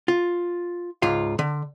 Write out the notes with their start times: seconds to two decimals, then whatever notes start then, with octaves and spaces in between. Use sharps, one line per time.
0.08 F4
1.02 C#2 G#2 F4 F5
1.39 D3